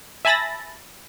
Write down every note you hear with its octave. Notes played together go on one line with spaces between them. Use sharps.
E5 G#5 A5 B5 A6 A#6